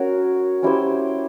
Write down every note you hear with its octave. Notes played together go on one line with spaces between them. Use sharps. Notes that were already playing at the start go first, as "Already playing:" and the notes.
Already playing: C#4 F#4 A#4
C#4 E4 G4 C5